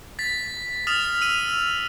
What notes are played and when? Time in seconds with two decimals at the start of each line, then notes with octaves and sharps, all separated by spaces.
0.19 A6 B6
0.87 D#6 F6 A6 E7 F7
1.21 E6 D#7 F7